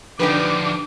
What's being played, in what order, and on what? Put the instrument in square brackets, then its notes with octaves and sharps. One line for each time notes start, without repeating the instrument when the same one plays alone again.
[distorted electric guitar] D3 F3 [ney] D4 [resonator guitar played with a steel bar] D#4 G4 B4 [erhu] D6